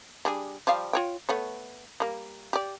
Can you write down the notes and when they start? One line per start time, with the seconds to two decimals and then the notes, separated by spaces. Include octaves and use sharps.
0.25 G3 D4 G#4
0.67 F3 G3 F5
0.93 F4 C#5 G5
1.29 A3 B3 C#5
2.00 G3 A#3
2.53 G4 D5